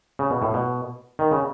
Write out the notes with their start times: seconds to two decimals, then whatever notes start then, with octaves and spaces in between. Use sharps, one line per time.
0.19 C#3
0.30 B2
0.42 A2
0.54 B2
1.19 D#3
1.31 C#3